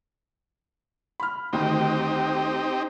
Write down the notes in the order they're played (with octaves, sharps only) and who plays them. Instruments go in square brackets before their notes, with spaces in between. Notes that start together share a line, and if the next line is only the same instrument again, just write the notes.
[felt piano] B5 F6
[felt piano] D2 D#3 [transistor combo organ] C4 D#4 G4